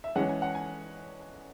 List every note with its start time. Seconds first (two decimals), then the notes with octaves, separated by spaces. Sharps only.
0.04 E5
0.15 E3 G#3 C#4 F#5
0.29 G#5
0.42 F#5
0.55 G#5